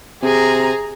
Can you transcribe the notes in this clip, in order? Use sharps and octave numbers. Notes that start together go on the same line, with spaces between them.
C3 G#4 A#5